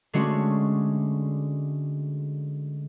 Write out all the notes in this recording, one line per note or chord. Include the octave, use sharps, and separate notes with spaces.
D3 G#3 A3 C#4 D4 F#4